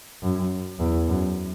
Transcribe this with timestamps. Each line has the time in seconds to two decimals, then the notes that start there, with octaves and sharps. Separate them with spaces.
0.22 F#2
0.80 E2
1.08 F#2